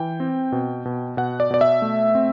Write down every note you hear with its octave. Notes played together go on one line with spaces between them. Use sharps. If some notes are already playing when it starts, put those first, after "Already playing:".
Already playing: E3 G5
C4
B2
B2
B2 F#5
D5
B2 D5
E5
A3
C4